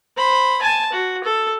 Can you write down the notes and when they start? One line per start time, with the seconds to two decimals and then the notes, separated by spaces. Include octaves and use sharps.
0.17 C5 B5
0.62 G#5 A5
0.92 F#4
1.24 A4